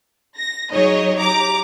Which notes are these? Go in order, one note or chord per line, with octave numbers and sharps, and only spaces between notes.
A#6
F#3 D#4 G#4 C#5 D#5
G4 A#5 D6